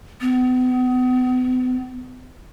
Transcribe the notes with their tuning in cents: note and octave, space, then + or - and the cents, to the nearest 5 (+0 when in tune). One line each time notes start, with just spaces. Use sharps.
B3 +40